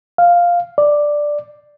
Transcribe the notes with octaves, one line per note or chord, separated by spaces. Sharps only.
F5
D5